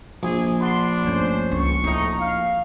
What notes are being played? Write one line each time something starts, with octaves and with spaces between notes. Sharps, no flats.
A#1 G#4
D4 F#5 B5 C6
G1 A3 C#4 C5
C#2 C#6
A2 C4 D#4
F5